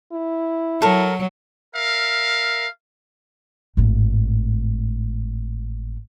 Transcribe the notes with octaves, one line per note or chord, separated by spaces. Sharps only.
E4
F#3 A4 A#4
A#4 E5 F5
G#1 A2